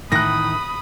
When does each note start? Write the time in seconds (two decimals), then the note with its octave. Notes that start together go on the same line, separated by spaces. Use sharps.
0.12 A2 D#3 E3 B5 D#6 F#6 A#6